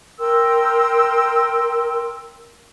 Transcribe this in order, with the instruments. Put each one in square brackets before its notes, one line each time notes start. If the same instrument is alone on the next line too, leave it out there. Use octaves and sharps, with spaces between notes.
[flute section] A#4 G5 C6 E6